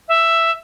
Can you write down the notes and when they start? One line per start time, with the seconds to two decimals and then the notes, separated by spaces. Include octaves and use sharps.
0.08 E5